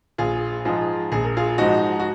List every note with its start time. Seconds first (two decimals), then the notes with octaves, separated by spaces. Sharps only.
0.18 A#1 F4 G#4
0.65 G#2 F3 G#3 F4 G#4
1.12 A#1 G#4
1.24 A#4
1.37 F4 G#4
1.58 G#2 F3 G#3 D#4 F#4
1.99 F#4